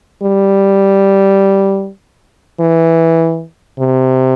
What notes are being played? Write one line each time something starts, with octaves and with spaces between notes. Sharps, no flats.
G3
E3
C3